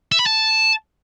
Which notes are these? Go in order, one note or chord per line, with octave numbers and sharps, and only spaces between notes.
E5
B5
A5